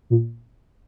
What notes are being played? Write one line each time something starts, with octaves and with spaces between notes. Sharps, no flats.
A#2